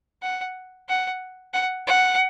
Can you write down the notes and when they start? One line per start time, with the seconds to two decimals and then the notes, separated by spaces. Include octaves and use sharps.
0.22 F#5
0.89 F#5
1.54 F#5
1.87 F#5